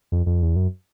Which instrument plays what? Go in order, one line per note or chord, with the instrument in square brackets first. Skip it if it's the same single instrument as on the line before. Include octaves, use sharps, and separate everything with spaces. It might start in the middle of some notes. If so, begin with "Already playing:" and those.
[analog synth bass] F2
F2
E2
F#2